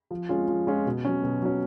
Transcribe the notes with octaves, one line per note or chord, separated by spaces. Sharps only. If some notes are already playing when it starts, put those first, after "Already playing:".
F3
G#3 C#4 F4
F3
G#3 C#4 F4
B2
F#3 C#4
B2
F#3 C#4